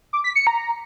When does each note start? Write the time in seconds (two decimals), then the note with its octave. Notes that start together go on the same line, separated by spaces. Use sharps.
0.13 D6
0.24 B6
0.35 C#7
0.47 A#5